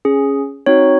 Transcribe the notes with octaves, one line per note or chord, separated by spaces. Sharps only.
C#4 G#4
C4 D#4 F#4 C#5